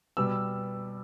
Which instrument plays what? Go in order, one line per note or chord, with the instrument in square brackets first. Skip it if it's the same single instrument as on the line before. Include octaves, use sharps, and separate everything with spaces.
[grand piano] B2 G3 B3 E6